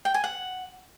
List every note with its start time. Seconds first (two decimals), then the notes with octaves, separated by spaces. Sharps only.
0.05 G5
0.14 G#5
0.24 F#5